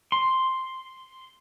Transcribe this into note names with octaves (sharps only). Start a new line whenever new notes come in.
C6